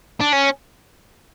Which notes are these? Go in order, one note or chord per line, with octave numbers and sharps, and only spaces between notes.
D4
C#4